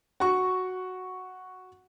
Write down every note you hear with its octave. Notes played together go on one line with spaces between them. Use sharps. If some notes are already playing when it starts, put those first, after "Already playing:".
F#4 C#6